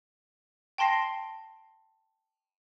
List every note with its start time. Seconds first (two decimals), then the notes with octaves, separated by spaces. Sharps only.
0.78 G5 A5 C6 A#6 C7